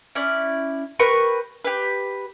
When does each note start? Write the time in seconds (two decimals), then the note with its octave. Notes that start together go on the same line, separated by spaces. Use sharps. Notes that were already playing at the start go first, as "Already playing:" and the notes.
0.15 C#4 E4 D5
0.99 G4 A#4 B4 C#6
1.64 G4 B4